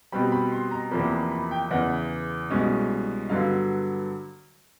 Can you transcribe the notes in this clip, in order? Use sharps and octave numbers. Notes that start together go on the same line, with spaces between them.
B2 G3 C4 B5
B5
C6
A#5
E2 C3 F3 A#3 B5
B5
B5
G5
E2 C#3 E3 F#5
C2 B2 G#3 C#4
G2 D3 F#3 B3 F5